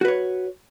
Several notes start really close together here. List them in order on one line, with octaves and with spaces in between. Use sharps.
F#4 B4 C#5